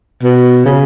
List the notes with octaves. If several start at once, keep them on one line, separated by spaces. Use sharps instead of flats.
B2
C#3